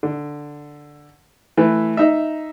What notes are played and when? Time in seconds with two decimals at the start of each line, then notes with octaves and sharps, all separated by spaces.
0.03 D3
1.57 E3 A3 B4
1.97 D#4 E5